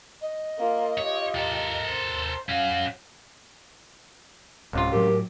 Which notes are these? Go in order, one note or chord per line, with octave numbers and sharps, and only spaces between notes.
D#5
A#3 F4
F4 G4 C#5
A4 A#4
C5
C#4 F#4 F5
D1 C#2 C3 F4
A2 F#3 G4 A#4